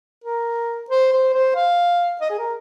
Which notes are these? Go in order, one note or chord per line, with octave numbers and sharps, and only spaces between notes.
A#4
C5
C5
C5
F5
D#5
G#4
A#4